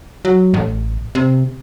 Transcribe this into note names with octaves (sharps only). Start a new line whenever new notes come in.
F#3
A1
C3